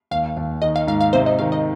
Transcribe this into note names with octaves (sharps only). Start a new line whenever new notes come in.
D#2 F5
D#2
D#3 D#5
F5
G#2 F5
F5
C3 C5
D#5
D#3 F5
D#5